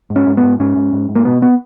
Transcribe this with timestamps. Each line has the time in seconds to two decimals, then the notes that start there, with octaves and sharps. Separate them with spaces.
0.10 G#2
0.16 C#4
0.27 G#2
0.37 B3
0.43 G#2
0.60 G#2 C#4
0.76 G#2
0.93 G#2
1.09 G#2
1.15 A#3
1.25 B2 B3
1.42 B3